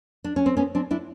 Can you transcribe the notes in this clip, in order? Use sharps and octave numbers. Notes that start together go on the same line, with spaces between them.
D4
C#4
C4
B3 C#4
C4 D4
D4 E4